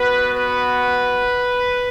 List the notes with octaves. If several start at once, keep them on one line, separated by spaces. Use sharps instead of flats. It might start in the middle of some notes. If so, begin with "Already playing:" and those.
Already playing: B3 F#4 B4
B4